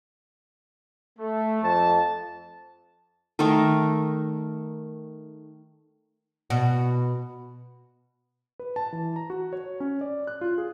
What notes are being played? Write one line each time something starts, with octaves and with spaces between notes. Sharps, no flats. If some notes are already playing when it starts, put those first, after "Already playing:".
A3
F2 A5
D#3 A3 A#4
B2 F#4
B4
A5
E3
A#5
F#4
C#5
C#4
D5
F#6
F4
G#4